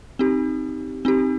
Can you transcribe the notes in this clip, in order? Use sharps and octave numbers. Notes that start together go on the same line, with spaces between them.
C4 D#4 G4
C4 D#4 G4